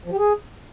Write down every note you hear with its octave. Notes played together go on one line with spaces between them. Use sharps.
F3
G4
G#4